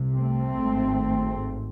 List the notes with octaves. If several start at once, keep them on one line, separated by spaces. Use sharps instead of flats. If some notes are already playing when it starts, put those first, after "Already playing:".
Already playing: C2 C3
A3 C4
G#1 G#2